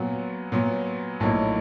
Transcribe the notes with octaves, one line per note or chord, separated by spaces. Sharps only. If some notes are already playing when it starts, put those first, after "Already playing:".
Already playing: A#2 F#3 B3
A#2 F#3 B3
A#1 A2 F#3 A#3 D#4